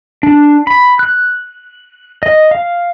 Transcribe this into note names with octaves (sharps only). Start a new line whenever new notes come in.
D4
B5
F#6
D#5
F5